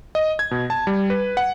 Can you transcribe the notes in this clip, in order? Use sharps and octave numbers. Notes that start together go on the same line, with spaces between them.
D#5
G#6
B2
A5
G3
B4
F#5